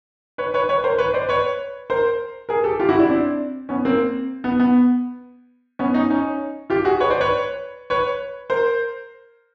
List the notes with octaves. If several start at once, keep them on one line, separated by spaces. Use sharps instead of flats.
B4 C#5
B4 C#5
B4 C#5
A#4 C5
B4 C#5
C5 D5
B4 C#5
A#4 C5
G#4 A#4
G4 A4
F4 G4
E4 F#4
D4 E4
C4 D4
B3 C#4
A#3 C4
B3
B3
B3 C#4
C#4 D#4
C#4 D#4
F4 G4
F#4 G#4
B4 C#5
C5 D5
B4 C#5
B4 C#5
A#4 C5